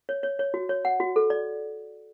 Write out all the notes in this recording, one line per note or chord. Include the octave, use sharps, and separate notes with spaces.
C#5
C#5
C#5
F#4
C#5
F#5
F#4
A4
D5